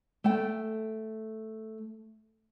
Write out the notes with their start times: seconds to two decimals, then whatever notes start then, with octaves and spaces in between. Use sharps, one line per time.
0.24 A3 G5